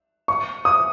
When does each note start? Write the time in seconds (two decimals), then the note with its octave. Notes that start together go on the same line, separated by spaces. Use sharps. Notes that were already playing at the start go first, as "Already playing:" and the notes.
0.28 C#6
0.65 D#6